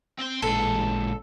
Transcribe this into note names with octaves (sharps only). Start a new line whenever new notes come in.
C4 C6
A1 A#2 G#3 A4